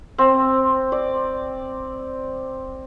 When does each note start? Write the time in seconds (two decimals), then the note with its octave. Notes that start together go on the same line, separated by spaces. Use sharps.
0.18 C4
0.92 D5